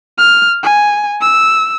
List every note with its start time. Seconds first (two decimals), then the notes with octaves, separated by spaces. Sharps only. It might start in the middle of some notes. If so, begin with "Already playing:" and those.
0.18 F6
0.64 G#5
1.22 E6